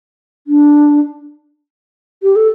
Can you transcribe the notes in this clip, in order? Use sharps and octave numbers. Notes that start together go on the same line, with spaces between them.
D4
G4
A4